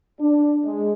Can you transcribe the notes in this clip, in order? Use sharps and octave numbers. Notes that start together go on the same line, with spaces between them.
D4
G#3